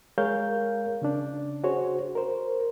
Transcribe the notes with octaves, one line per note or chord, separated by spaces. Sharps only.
G#3 G#4 A#4 C#5 F5 G6
C#3 C#4 D4
F#4 G#4 C5 C#5
A#4 C5